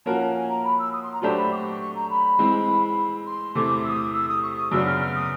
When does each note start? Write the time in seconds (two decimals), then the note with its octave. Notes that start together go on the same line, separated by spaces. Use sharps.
0.06 F3 A#3 C#4 F#4 A#4 A5
0.20 A5
0.35 G#5
0.49 A#5
0.64 B5
0.79 E6
0.93 D#6
1.02 C6
1.12 A#5
1.22 F#3 A3 D4 G4 C5 A5
1.37 B5
1.51 D6
1.56 C#6
1.81 C#6
1.95 A#5
2.10 B5
2.39 E3 G#3 C4
3.26 C6
3.55 E2 C3 E3 A3 D6
3.84 E6
3.89 D#6
4.13 E6
4.28 D#6
4.42 C#6
4.57 D#6
4.71 F#2 C#3 F#3 B3 D4 E6
4.87 F6
5.01 F6
5.15 D#6